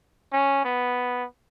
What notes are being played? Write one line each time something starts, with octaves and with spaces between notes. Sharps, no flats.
C#4
B3